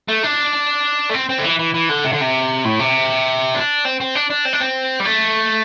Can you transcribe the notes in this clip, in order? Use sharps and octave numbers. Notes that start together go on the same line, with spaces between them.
A3
D4
A3
C4
C4
D3
E3
E3
E3
D3
C3
D3
C3
A2
C3
D4
C4
C4
D4
D4
C4
D4
C4
G3
A3